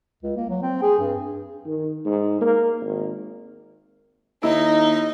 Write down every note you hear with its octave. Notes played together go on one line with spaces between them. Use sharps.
C#2
A#3
F#3
C4
G#4
G2
D#3
G#2
A#3
G#1
D#2 D#4 E4 D#5